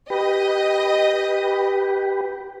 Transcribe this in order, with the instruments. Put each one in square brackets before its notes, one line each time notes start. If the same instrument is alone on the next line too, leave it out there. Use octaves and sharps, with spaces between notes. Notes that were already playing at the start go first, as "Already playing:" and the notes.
[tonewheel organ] G4 B4 [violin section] D#5